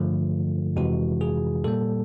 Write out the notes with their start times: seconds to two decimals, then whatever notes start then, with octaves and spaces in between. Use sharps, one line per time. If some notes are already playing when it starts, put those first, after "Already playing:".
Already playing: G2 D3 F3 A3 F4
0.76 F2 C3 E3 G#3 F#4
1.21 G#4
1.64 A#2 G3 A#3 A4